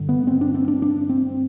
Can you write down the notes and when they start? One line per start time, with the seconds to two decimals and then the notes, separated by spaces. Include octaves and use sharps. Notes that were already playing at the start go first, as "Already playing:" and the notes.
Already playing: G2 D3
0.09 B3
0.27 C4
0.41 D4
0.54 C4
0.68 D4
0.82 D4
1.09 C4